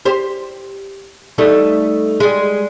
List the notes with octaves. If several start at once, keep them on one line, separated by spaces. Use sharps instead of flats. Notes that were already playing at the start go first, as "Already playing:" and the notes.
G4 C5
G3 A3 D#4
G3 G#3